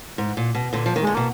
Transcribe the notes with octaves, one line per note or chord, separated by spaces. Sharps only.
G#2
A#2
B2
A#2 D3
F3
D#3
G#3
D3
B2 A#3